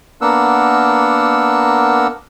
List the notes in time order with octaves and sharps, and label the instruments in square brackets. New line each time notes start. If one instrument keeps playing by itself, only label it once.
[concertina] A#3 B3 D4 A#4 F#5 E6